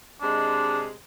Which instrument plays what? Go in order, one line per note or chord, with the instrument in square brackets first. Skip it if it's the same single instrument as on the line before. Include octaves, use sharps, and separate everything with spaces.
[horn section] C3 G#3 [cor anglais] D4